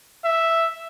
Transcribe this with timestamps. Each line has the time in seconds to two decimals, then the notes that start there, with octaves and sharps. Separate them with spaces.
0.24 E5